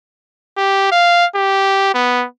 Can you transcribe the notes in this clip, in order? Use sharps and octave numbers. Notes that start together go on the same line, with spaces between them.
G4
F5
G4
B3